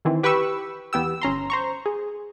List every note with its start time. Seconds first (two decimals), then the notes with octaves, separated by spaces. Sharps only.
0.05 D#3 E3 C4
0.23 G4 B4 G5 B5 C#6 E6
0.93 E2 B3 G4 E6
1.22 G1 C#4 A#5 C6
1.50 C5 A#5 C#6
1.86 G#4